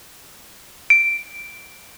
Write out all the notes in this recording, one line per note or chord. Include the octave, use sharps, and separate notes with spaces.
D7